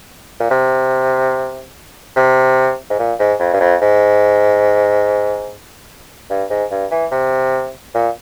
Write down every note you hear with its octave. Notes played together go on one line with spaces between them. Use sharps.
A#2
C3
C3
G#2
A#2
G#2
F2
G2
F2
G#2
G2
G#2
G2
E3
C3
A#2